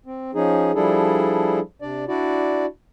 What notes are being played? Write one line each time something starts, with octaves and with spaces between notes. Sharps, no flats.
C4
F3 C#4 D#4 G#4
F3 G3 D4 E4 G#4 A4
C3 D4 D5
D4 E4 F#4 D5